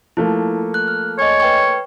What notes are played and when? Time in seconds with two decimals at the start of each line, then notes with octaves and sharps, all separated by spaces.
0.17 F3 A3 A#3 E4
0.74 F#6
0.88 F6
1.19 C#5 D#5 G#5 C#6
1.40 B4 G5 C#6